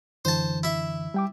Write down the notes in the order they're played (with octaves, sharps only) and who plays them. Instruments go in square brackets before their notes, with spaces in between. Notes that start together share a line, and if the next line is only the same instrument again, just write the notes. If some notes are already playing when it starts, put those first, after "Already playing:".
[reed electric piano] F#2 D3 E3 [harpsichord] C5 A5
[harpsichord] E4 E5
[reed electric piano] G3 G5 D6